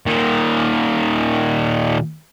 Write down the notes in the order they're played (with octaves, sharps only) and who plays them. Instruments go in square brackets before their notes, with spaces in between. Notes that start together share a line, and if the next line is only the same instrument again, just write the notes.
[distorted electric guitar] A#2 D#3